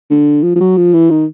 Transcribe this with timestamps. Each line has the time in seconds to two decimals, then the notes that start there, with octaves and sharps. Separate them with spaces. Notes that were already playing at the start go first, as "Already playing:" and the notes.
0.10 D3
0.43 F3
0.55 F3
0.60 F#3
0.77 F3
0.94 E3
1.10 D#3